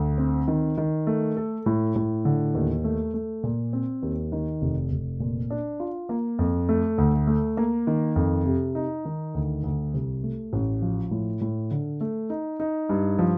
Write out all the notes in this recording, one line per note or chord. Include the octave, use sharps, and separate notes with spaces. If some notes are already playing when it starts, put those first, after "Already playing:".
Already playing: D2
C4
D#3
D#3
A3
A4
A2
A2
D3
D#2
A3
A3
A#2
C4
D#2
D#3
F1
F1
A#2
D4
F4
A#3
F2
A3
D2
A3
A#3
D#3
F2
C3
D#4
D#3
D2
D2
C2
A3
A1
F3
A2
A2
D3
A3
D#4
D#4
G2
F3